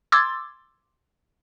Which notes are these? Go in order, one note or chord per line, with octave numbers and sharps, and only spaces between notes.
C6 D6 E6 G#6 A6